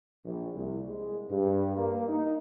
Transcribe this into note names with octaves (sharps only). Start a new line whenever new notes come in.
A#1
C2
G#3
G2
A#3
D#4